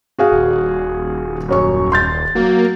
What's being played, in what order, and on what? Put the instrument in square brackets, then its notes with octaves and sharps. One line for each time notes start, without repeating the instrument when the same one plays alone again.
[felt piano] F#4 G#4 F5
[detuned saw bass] D#1
[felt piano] F#2 C#5 C#6
C6 G6 A6
[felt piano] F#3 [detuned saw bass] A#3